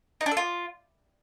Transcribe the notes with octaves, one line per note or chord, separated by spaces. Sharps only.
D#4
D4
A4
F4